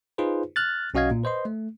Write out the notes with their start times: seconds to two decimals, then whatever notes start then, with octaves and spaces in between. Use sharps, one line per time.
0.18 D#4 F4 G#4 B4 C5
0.56 F6 F#6 A6
0.94 B1 C#4 F#4 D#5 F5 G#6
1.11 A#2
1.23 B4 C5 D#5 C6
1.45 A3